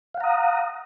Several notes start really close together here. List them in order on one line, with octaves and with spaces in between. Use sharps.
F5 F#5 A#5 D#6